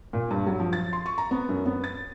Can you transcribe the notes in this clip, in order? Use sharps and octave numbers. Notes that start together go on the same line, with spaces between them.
A#2
G2
F#3
F3
A6
C6
C#6
A#5
B3
F#2
B3
A6